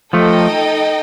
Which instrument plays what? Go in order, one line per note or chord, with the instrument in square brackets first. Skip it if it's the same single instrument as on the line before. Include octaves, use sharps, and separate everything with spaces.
[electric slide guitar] F3 A3 [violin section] D#4 A4 D#5 G5